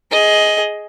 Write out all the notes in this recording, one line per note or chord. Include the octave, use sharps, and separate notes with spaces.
G#4 D#5